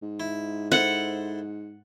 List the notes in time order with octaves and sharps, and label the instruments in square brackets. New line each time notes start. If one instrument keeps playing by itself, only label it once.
[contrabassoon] G#2
[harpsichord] E4
[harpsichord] E4 A4 C5 [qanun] F#5